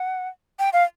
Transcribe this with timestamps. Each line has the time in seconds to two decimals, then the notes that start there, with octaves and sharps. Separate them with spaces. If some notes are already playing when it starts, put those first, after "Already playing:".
Already playing: F#5
0.59 G5
0.73 F5